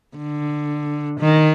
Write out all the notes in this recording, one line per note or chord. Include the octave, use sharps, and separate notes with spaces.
D3
D#3